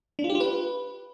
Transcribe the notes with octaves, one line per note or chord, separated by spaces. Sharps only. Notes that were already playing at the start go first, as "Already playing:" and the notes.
D4
F4
G4
F4
B4